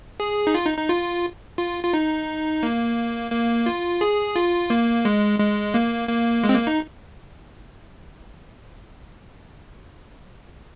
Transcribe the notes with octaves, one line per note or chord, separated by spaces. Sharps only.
G#4
D#4
F4
D#4
D#4
F4
F4
F4
D#4
A#3
A#3
F4
G#4
F4
A#3
G#3
G#3
A#3
A#3
G#3
C4
A#3
D#4